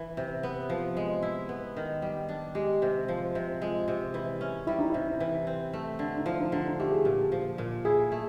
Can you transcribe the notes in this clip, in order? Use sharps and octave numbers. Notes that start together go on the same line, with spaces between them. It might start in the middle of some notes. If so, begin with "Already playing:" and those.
Already playing: E3
C3
B3
F3
G#3
E4
B3
D#3
G3
D4
G#3 G4
C3
F3
C3
G#3 F4
C3
E3
C#4
G3 E4
D#4
C3 E4
E3
C4
A3
D3
D#4
F3 E4
D#4
D3 D#4
D#4
A3 G4
G#4
A#2 G4
F3
A#2
E4 G#4
A3